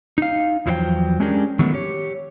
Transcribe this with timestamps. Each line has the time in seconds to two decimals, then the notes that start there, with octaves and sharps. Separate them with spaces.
0.18 D#4 F5
0.66 E2 F3 F#3 E4 C5 G5
1.20 G#3 C#4 D4 G4 G#4 A#4
1.59 D#3 F#3 G#3 A3 B3
1.74 G4 C#5